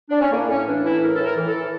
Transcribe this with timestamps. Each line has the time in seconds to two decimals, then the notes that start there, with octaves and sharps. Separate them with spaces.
0.10 D4
0.21 C#4
0.31 A2 A#3
0.49 A2 C#4
0.66 E3 D4
0.83 E3 E4
1.01 A2 A#4
1.14 A2 A4
1.24 A#4
1.36 E3
1.47 A4
1.53 E3